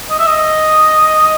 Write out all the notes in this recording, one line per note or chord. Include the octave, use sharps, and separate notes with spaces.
D#5
E5
D#5